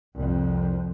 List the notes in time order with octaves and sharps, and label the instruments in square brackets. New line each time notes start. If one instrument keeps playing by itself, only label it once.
[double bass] C2 F2